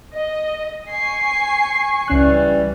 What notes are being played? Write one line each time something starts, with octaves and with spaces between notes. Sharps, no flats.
D#5
G#5 C#6 C7
C#2 E3 G3 C#4 F#6